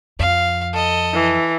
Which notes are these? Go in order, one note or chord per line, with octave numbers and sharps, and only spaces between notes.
F2 F5
A4 D#5
E3